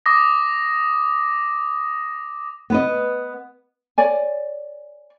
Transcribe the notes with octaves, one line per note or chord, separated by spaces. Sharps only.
D6 D#6 A#6
B3 B4 D#5
C#5 D5 G#5